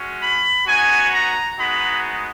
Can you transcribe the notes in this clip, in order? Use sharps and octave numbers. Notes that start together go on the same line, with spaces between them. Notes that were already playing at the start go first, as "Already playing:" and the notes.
Already playing: G#3 C#4 F#4
B5
B3 D#4 F#4 G#5
A#5
G#3 B3 D#4 F#4 B5